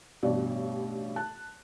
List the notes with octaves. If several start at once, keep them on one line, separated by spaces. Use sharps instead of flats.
A1 G2 B2 D5
A5 F#6